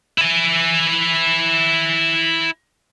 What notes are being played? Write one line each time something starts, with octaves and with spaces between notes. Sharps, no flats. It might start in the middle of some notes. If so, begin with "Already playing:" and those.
E4 G#5